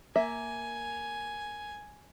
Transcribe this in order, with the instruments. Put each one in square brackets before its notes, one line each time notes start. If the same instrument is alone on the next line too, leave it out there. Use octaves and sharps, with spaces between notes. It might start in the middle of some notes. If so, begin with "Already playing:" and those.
[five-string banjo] A#3 E5 [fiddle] G#5